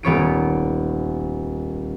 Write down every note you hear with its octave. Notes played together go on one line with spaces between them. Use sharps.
D#1 B3 C#5 D7